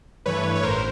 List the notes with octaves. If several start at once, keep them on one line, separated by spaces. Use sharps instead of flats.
G2 E3 A3 B4 C#5
C#5
A1 A#4 C5